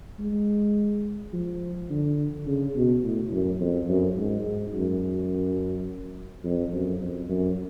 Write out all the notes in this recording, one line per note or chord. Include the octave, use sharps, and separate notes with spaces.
G#3
F3
D3
C#3
B2
A2
F#2
F2
F#2
G#2
G#2
F#2
F2
F#2
F2
F#2